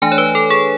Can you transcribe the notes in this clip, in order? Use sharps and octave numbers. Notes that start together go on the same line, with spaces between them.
E3 A3 D4 G#5
C#5
B4
A4
G#4